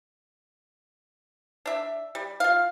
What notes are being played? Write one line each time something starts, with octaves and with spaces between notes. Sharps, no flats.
D4 E5
G3
F4 F5